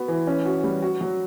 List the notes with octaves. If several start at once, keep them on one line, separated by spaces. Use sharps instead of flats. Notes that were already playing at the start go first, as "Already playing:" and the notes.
Already playing: B3 F#4
E3
C#4
F#4
G3
F#4
F#3